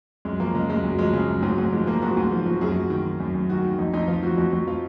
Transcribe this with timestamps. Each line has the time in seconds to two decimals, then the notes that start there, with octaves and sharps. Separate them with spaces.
0.25 F#2 G#3
0.40 F3 A#3
0.54 C#3 G#3
0.70 F#2 G#3
0.84 F#2 F#3
0.98 F3 G#3
1.13 C#3
1.28 F#2
1.42 G#2 F#3
1.58 G#2
1.72 F3 G#3
1.87 F3 A#3
2.02 G#2 F#4
2.17 G#2
2.32 F3
2.46 F3 F#4
2.61 F#2 G#4
2.76 F#2 F#4
2.90 D#3
3.05 D#3
3.20 F#2
3.35 F#2
3.49 D#3 F#4
3.64 D#3
3.79 F2 D#4
3.94 F2 D#4
4.08 F3 F4
4.23 F3 F#4
4.38 F2 F#4
4.53 F2 F#4
4.67 F3 F4